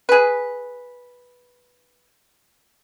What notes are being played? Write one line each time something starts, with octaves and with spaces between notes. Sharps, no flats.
G#4 B4